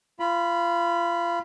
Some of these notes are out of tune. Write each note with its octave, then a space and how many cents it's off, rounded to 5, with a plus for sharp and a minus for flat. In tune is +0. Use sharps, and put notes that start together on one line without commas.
F4 -25 B5 +0